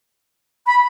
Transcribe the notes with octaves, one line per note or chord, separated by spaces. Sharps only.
B5